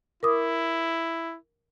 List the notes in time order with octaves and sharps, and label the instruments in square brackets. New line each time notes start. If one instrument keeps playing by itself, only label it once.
[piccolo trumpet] E4 [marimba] A#4 D6 D#6